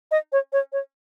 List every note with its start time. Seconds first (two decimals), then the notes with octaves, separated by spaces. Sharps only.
0.11 D#5
0.32 C#5
0.53 C#5
0.72 C#5